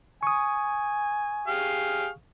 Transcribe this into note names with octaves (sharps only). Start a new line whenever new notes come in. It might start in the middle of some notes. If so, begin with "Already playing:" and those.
G#5 C#6 D#6
G4 G#4 F5